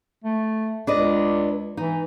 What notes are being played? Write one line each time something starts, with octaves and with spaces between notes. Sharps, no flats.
A3
C#2 D4 B4 D#5
E3 D#4